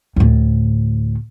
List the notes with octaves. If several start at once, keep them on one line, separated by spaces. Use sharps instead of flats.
D2 A2